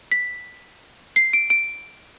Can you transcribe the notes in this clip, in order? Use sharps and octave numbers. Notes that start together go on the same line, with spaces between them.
B6
C7
D7
D7